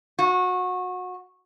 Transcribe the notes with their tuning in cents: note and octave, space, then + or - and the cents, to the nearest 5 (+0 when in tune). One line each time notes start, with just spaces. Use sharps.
F#4 -25